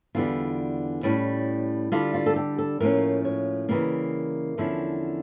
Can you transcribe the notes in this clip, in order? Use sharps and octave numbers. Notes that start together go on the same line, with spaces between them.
E2 D3 G3 F4
A2 G3 C#4
D3 G3 D4 F4
F4
A4
G4
A4
A2 F3 A#3 C#4 A#4
C#5
C#3 E3 G3 A#3 A#4
E2 D3 F3 C#4 E4